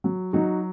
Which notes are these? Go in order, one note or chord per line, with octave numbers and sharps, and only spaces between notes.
F#3
F#3 D#4 F#4